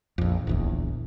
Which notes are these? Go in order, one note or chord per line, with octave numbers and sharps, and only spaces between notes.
A#1 F2
D1 A#1 E2